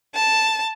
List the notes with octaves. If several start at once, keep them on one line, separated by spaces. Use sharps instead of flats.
A5